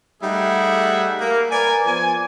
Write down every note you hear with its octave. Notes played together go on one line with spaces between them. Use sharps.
G3 A3 D#4 G#4 E5 F#5
A#3
A#4 B4 D5 G#5
F3 B3 D5 G#5